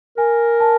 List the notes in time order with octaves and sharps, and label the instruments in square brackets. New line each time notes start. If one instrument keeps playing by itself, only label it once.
[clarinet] A#4 [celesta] G#5
[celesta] A5